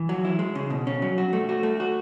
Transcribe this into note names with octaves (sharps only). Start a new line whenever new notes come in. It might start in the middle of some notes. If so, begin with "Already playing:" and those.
Already playing: E3
F#3
E4
G#3
C#3
B2
C#4
F#3
F#4
A3
F#4
A3
F#4